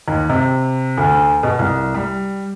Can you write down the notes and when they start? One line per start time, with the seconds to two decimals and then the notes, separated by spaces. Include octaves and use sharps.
0.08 D#2
0.29 C3
0.98 D2
1.43 B2
1.59 C2
1.94 G3